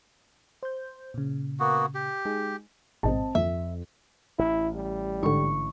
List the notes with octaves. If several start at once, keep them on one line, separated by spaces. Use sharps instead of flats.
C5 G6
A#2 C#3
A#3 B3 F#4
G4
G#3 D#4 G#4
A1 G#2 B2 C4 D#5 A5
F2 E5
A1 E4
G3
G#2 D3 C#6